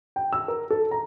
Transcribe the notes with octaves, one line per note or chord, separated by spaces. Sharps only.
G5
E6
A#4
A4
A#5